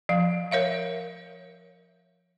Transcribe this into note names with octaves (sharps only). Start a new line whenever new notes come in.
F3 F5
A#4 C#5 E5 F5